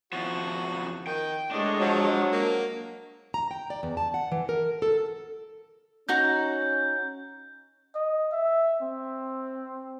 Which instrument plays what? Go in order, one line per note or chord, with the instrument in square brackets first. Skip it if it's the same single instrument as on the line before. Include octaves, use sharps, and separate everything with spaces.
[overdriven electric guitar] E2 F3 [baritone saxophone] F#4
[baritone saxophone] D#3 [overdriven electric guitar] G5
[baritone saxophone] A2 [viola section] G#3 C#5 D#5 [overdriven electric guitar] D4
[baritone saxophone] F3 [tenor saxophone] F#3
[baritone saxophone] A#3
[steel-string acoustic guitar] A#5
G5
D5
E2
A5
F#5
E3
A#4
A4
[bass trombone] C#4 [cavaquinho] D#4 F#4 A#5 [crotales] G6
[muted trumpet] D#5
E5
C4